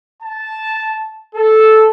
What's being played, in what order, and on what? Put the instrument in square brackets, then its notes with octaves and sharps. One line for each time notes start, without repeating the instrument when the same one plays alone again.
[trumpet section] A5
A4